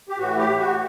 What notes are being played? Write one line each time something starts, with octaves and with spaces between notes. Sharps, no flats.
G4
A2 E3 F#4
G4
F#4